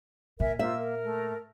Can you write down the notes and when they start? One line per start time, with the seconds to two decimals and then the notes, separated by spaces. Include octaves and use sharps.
0.40 A#2 A#4 E5 G#5
0.59 A#3 F4 C5 E5 E6
0.78 A#4
1.04 A3